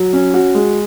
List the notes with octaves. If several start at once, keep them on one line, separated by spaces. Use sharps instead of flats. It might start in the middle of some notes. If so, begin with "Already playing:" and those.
Already playing: F#3
C#4
F#4
G#3